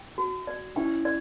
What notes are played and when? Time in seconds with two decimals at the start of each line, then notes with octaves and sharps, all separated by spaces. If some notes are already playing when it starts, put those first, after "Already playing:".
Already playing: G5
0.18 F#4
0.47 D5
0.76 C#4 E4 G5
1.05 D5